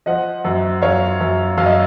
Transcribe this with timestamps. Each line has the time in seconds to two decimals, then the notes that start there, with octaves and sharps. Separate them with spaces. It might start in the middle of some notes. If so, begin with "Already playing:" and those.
0.06 F3 D#5 F#5
0.45 F#2
0.82 F#2 C#5 F5
1.21 F#2
1.58 F#2 F5
1.66 D#5